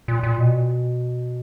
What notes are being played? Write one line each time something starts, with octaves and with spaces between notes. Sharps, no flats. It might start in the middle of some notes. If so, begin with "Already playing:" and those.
A#2
A#2
B2